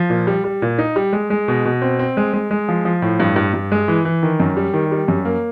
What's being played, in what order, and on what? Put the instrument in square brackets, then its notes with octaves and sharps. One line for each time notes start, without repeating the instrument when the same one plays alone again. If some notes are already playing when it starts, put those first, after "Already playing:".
Already playing: [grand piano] F3
A#2
G3
G3
A#2
D#4
G3
G#3
G#3
B2
B2
C4
C4
G#3
G#3
G#3
F3
F3
A2
G2
G2
G2
G#3
E3
E3
D#3
F#2
G3
D#3
G3
F#2
A#3